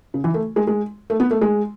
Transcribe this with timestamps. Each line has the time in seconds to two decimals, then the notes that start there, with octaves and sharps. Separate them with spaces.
0.14 C#3
0.24 E3
0.34 A3
0.56 G#3
0.67 G#3
1.10 A3
1.20 B3
1.31 A3
1.41 G#3